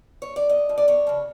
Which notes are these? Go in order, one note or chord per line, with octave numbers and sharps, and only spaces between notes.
C#5
D5
E2 D#5
C#3 F3
D5
E2 C#5
C#3 F3